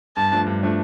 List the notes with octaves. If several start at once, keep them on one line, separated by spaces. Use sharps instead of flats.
G2 A5
F3 A3 D4
G2
F3 A3 D4